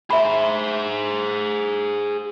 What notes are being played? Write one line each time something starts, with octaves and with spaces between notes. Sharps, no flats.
G#4 C5 E5 B5